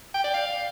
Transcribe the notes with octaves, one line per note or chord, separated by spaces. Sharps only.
G5
D5
F5